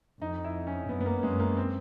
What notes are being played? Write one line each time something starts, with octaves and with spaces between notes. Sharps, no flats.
F2 D#4
E4
C#4
F#2 B3
B3
A#3
F#2 G#3
A#3
C4